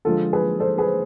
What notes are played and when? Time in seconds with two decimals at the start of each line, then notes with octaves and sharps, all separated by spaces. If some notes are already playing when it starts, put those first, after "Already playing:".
0.05 D3 F3 G#3 F4 A4
0.33 G#4 B4
0.60 A4 C5
0.78 G#4 B4